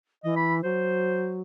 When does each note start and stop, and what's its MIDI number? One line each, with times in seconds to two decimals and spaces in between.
0.24 0.63 52
0.24 0.34 75
0.36 0.56 83
0.64 1.42 54
0.64 1.38 72